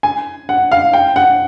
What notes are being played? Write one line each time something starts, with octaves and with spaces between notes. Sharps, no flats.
G#5
F#5
F5
G5
F#5